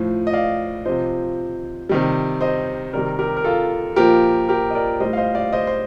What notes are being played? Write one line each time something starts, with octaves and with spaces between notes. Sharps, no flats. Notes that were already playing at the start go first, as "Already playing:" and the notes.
Already playing: A2 F3
D#5
D5 F5
C3 F3 C5 D#5
C3 D#3 G3
C5 D#5
C3 D#3 G3 A#4 D5
G4 A#4
A#4
F4 A4
A#2 F3 G4 A#4
G4 A#4
D#5
A#4 D5
A2 G3 C5 D#5
F5
C5 D#5
D5 F5
C5 D#5
C5